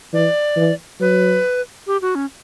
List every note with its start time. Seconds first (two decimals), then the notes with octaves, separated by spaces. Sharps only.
0.13 E3 D5
0.57 E3
1.00 F#3 B4
1.87 G4
2.02 F#4
2.15 C#4